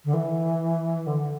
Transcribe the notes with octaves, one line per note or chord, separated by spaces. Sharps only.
D3
E3
D3